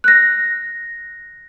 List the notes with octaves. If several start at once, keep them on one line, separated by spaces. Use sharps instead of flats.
F#6 A#6